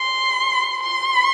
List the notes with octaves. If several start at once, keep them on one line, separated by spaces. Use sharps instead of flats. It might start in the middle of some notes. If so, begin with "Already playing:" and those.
Already playing: C6
C6